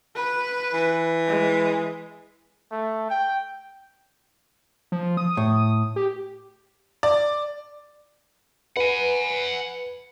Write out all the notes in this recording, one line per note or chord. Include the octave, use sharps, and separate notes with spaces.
B4
E3
G#3
A3
G5
F3
D#6
A2
G4
D5
B4 F#5 G#5